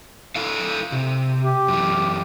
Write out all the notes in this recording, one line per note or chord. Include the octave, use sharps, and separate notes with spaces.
E4 A4 F5
C3
G4
F#2 E3